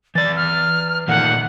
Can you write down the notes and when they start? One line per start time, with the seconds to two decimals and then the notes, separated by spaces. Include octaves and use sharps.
0.15 E3 D5 A6
0.36 F6
1.08 A#2 D#3 A3 F#5